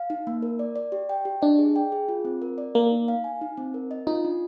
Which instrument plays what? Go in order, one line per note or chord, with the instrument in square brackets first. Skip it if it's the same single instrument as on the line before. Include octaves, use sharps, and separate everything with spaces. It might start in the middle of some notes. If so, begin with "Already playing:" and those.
Already playing: [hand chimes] F5
D#4
A#3
A#4
D5
D5
G4
G5
G4
[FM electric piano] D4 [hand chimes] D#5
[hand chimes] G#4
G5
G#4
F4
C4
A#4
D5
[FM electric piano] A#3 [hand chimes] A#4
[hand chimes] D#4
F5
G#5
D#4
C4
A#4
D#5
[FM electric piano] D#4 [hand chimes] F4
[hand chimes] D4